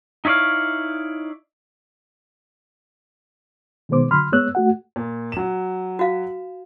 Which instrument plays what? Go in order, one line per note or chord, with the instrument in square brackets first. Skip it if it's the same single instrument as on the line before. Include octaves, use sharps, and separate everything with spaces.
[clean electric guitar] D#4 E4 C#5 D5 F5
[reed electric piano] B2 D#3 G#3 B3 C5 D6
D3 F#3 B5 C6 F6
G#3 B3 C#5 E6 F#6
A3 F#4 F#5
[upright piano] A#2
F#3 E7
[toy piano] F#4 F5